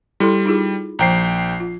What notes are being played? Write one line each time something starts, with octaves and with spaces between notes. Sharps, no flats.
G3 E4 A4 C6
D#4 F4 G#4
A#1 F3 G5 A#5 C7
F4